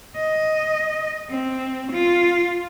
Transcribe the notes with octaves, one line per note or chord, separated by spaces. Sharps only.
D#5
C4
F4